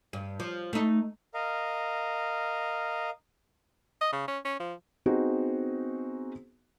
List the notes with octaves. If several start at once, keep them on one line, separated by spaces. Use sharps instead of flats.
G2
F3
A3 D#4
A#4 D#5 F5
D#5
C#3
C#4
C#4
F3
B3 C4 D#4 F#4 G#4